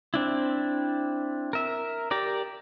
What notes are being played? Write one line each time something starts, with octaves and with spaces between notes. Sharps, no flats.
C4 D4 E4
A#4 E5
G4 A#4 D5